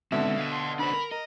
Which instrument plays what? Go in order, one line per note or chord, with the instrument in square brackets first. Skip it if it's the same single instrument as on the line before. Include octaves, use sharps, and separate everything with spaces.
[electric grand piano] B2 D3 [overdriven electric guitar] G#3 C4 [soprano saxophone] E5
[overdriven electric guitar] D#5 F5
[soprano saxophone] C6
[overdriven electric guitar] D4 C5 [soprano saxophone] B5
[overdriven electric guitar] A#4
[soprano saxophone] A#4 [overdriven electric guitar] D#5